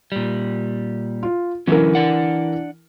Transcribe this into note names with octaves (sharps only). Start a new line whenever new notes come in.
A#2 G3
F4
D3 E3 F#3 C#4 A#4
D4 D5 F#5